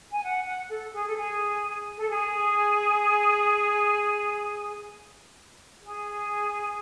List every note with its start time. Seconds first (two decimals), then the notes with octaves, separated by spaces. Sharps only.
0.11 G#5
0.23 F#5
0.45 F#5
0.69 A4
0.93 G#4
1.07 A4
1.16 G#4
1.97 A4
2.09 G#4
5.82 G#4